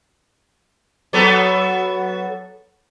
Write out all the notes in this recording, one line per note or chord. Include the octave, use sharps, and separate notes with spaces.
F#3 B3 A4